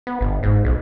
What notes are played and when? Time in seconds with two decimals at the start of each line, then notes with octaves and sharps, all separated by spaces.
0.07 B3
0.21 G1
0.43 G#2
0.65 B1